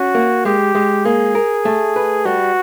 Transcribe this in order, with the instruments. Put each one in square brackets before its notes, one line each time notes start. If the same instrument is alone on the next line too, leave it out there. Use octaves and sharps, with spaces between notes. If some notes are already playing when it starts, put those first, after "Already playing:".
Already playing: [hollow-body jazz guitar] C#4 [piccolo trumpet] F#4
[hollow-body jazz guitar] A#3
[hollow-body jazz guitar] G#3 [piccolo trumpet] G4
[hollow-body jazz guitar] G#3
[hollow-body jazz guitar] A#3 [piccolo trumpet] G#4
[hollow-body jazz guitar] A#4
A3
B4
[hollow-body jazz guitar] G3 [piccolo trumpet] F#4